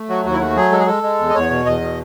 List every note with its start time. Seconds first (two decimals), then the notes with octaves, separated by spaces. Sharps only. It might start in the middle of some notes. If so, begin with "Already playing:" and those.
Already playing: A3
0.09 F#3 F#4
0.24 D#2 F#4
0.33 E4
0.40 A3 F#4
0.56 F#3 G#4
0.72 G#3 A4
0.79 G#4
0.87 G#3 A4
1.03 G#3
1.19 E2
1.30 D#5
1.35 E2 C#5
1.51 B2
1.66 E2 D#5
1.81 B2